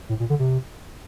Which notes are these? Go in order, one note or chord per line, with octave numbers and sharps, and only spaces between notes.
A2
A#2
D3
C3